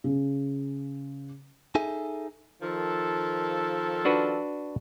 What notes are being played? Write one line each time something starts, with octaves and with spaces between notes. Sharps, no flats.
C#3
D#4 G#4 A4 E5 G#5
D#3 F3 A4
D4 F#4 B4